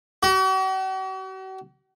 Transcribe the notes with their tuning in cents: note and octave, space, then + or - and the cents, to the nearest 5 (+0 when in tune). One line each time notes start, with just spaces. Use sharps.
F#4 +45